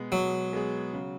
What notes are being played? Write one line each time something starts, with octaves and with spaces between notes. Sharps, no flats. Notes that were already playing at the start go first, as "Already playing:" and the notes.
Already playing: B2 G#3 B3 G#4
B2 F#3
G#3 B3 G#4
C#3